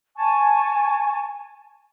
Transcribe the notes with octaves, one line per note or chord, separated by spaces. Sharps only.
G#5 A5 C#6